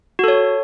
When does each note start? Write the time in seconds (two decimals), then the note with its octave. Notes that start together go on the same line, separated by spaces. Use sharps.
0.19 F#4
0.24 A4
0.28 C#5